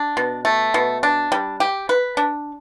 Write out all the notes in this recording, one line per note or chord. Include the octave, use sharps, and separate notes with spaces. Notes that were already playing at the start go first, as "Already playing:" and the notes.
Already playing: D4
B2
A3
B2
D4
G3
G4
B4
D4